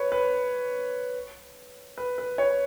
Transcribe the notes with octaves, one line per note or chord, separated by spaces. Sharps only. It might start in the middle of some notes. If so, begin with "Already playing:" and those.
Already playing: B4 C#5
B4
B4
B4
C#5